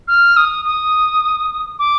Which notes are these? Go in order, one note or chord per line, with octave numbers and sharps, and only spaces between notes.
F6
D#6
D#6
D6